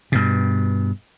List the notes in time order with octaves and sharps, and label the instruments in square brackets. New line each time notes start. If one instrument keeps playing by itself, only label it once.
[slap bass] G2 B2